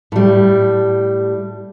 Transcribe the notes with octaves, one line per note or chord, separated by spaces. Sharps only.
A2 G3